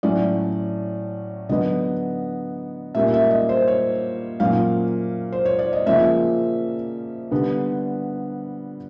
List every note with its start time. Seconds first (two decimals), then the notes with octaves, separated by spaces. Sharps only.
0.03 A2 F#3 A3 C#4 D5
1.49 D3 F#3 B3 D#5
2.95 A#2 G3 A#3 C#4 E5
3.14 E5
3.31 D#5
3.49 C5
3.68 C#5
4.40 A#2 F#3 A#3 C#4 F5
5.32 C5
5.45 C#5
5.59 D5
5.73 D#5
5.86 C#3 F3 A#3 C#4 E5
7.31 D3 G3 B3